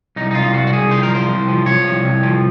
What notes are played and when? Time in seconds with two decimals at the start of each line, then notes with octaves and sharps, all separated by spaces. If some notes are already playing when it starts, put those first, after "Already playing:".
0.16 C2 D#4
0.31 D#4
0.35 C2 F4
0.53 C2 F#4
0.67 F#4
0.73 C2 G#4
0.91 F3 C5
1.03 A#4
1.10 C2 C5
1.29 C2
1.48 F3
1.66 F3 C#5
1.85 C2
2.04 C2
2.23 F3